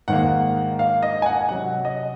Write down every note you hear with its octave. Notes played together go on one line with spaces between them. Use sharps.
G#2 D#3 A#3 F#5
F5
D#5
G#5
F#5
C3 F#3 C#4 F#5
D#5